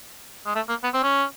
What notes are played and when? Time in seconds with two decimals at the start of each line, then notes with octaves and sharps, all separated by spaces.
0.46 G#3
0.55 A3
0.69 A#3
0.83 B3
0.94 C4
1.03 C#4